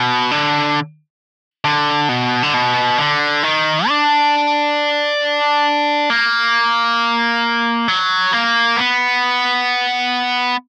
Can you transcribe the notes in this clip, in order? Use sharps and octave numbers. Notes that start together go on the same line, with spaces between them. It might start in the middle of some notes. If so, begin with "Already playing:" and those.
Already playing: B2
D3
D3
B2
D3
B2
D3
D#3
D4
A#3
F#3
A#3
B3